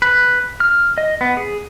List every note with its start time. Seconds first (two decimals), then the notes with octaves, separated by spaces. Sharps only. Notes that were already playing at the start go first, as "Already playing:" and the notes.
0.02 B4
0.60 F6
0.98 D#5
1.21 B3
1.37 G#4